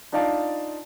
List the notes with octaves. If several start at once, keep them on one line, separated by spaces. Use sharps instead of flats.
D4 D#4 F4 D5 F5 A5